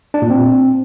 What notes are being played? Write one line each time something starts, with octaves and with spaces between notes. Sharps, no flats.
D4
A#2
C4